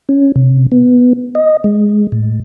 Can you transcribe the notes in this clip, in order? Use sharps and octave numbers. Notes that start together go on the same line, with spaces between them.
C#4
C3
B3
D#5
G#3
A2